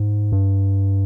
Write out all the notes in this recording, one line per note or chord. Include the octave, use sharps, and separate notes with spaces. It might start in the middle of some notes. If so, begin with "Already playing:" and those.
Already playing: G#2
G2